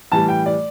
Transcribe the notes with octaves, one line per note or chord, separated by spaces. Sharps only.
A2 E3 G3 A5
G5
D5